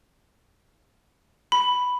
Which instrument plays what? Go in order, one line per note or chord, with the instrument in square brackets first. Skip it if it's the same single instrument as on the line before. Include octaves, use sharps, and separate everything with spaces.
[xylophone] B5